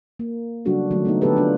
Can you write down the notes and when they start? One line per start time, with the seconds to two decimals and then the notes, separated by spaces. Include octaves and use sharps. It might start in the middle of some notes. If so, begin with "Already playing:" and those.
0.19 A#3
0.65 C#3 F#3 G3 D4 F#4 A4
0.91 D3 D#3 F#3 A3 C#4
1.05 A3 B3 D#4
1.21 D3 D#3 B3 G4 A4 B4
1.37 D4 F4